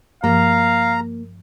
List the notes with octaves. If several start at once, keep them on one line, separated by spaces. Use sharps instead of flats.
G2 F3 A#3 F5 A#5